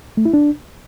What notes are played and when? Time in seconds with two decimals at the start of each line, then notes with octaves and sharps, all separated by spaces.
0.17 A3
0.25 E4
0.34 D4